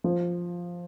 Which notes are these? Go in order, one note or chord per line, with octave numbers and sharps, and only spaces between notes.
F3